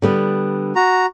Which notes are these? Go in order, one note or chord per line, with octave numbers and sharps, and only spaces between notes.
D3 G3 B3
F#4 A#5